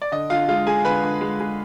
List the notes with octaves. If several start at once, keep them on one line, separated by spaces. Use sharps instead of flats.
D5
D3 D#5
D3 F4 F5
G#3 F4 F5
G#3 G#4 G#5
D3 B4 B5
D3
G#3
G#3